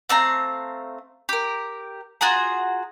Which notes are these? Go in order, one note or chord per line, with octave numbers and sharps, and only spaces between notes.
A3 C4 F5 A#5
G4 A#4
F4 F#4 G#4 A#5